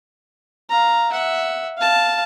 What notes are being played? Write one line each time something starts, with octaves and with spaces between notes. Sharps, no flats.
F5 A#5
E5 F#5
F5 A5